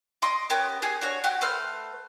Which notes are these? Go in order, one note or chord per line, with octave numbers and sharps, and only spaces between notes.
D#5 C6 D6
B3 C#4 G4 A#4
G4 G#4 G#5
D4 F#4 C#5
F#4 G4 F#5 G5
A3 B4 C5 F6